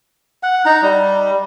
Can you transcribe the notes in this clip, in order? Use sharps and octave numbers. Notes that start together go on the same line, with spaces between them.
F#5
D#4 A#5
G3